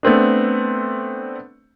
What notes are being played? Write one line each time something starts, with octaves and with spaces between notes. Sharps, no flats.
A3 B3 C4 D4